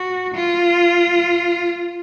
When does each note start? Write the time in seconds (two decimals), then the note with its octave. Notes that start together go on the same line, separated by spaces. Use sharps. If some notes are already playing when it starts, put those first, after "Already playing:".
Already playing: F#4
0.34 F4